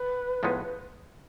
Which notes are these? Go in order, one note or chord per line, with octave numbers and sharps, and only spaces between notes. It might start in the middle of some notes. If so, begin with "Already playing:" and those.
Already playing: B4
A2 F3 G#3 B3 D#4